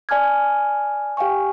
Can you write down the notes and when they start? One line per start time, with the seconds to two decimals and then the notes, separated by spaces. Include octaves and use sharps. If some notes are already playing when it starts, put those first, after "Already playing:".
0.09 D5 G#5 A5 D6 F6 G#6
1.17 G4 F5 G5 G#5 C#6